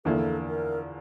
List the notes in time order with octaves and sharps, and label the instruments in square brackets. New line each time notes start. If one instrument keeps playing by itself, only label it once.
[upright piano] E2 D3 F3 A#3 E4 [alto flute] A4
[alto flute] A#4